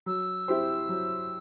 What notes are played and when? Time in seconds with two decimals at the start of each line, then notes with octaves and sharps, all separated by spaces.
0.06 F#3 E6
0.48 C4 E4 G4 C5
0.89 F#3